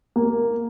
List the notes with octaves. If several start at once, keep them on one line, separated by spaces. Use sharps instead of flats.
A#3